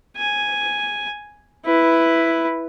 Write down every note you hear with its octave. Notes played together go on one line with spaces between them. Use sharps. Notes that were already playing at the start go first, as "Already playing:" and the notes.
G#5
E4 B4